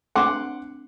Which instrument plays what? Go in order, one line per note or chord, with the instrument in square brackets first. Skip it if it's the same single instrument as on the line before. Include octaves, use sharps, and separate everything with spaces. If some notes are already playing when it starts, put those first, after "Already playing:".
[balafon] A3 C4 D4 [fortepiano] F#5 C6 D6